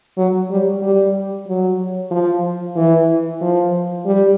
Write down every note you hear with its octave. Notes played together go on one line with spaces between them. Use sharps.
F#3
G3
G3
F#3
F3
E3
F3
G3